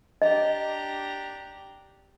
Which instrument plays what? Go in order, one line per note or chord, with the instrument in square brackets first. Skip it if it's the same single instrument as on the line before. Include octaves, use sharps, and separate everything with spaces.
[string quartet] D4 G4 A#5 [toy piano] D#5